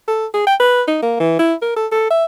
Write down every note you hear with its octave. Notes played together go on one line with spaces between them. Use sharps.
A4
G#4
G5
B4
D#4
A#3
E3
E4
A#4
A4
A4
E5